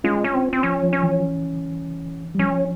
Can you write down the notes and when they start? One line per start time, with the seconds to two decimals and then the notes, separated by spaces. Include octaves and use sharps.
0.04 G#3 C#4 F4
0.24 C#4
0.34 C4
0.53 C4
0.63 F3 C#4
0.83 F3
0.93 C#4
1.03 E3
2.35 G3
2.39 F3 C#4